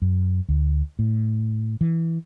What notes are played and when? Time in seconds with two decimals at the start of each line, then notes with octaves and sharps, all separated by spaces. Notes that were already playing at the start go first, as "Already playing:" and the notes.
0.02 F#2
0.49 D2
0.99 A2
1.81 E3